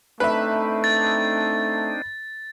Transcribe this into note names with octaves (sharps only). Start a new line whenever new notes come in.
A3 C4 D4 D#4 B4 E5
A6